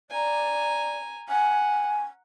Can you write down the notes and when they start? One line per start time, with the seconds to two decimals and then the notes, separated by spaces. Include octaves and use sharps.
0.10 D5 G#5 A#5
1.29 F#5 G#5